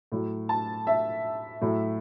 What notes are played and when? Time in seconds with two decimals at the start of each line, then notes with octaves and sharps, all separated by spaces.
0.12 A2 F#3
0.49 A5
0.87 E5
1.61 A2 F#3